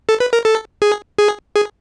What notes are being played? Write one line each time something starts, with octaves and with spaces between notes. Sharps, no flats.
A4
B4
A#4
A4
G#4
G#4
G#4